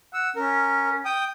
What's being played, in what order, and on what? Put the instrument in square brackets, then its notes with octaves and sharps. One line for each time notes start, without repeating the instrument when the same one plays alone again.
[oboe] F#5 [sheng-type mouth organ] E6
[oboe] C#4 [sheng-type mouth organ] A#4
[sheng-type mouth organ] G5 D#6